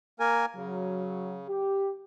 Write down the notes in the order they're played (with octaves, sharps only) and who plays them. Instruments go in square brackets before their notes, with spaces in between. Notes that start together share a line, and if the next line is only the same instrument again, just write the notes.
[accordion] A#3 A#4 G#5
[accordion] C#3 [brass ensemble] F#3
[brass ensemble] G4